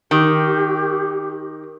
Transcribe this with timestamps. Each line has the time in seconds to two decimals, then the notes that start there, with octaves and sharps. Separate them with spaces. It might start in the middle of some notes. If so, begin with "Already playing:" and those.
0.11 D#3 G4